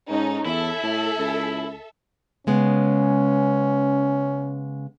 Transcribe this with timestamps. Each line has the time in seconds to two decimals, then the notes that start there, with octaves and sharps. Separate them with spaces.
0.10 G#2 C#4 D#4 A4
0.46 E2 E4 A4 E5
0.83 A2
1.18 C#2
2.47 C#3 G#3 B3 C#4